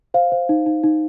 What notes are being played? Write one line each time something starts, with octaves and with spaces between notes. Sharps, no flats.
C5 F5
C5
D#4
D#4
D#4